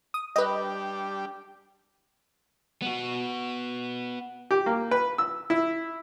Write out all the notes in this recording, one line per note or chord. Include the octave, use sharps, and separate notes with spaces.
D#6
G3 D4 G4 B4 D#5
B3 F#4
G4
A#3
B4
E6
E4